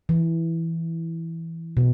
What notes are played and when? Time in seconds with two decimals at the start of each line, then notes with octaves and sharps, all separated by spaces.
0.09 E3
1.77 B2